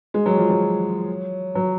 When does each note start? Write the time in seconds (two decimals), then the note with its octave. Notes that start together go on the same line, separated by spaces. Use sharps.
0.14 G#3
0.26 F#3
0.37 F3
0.50 F#3
1.55 F#3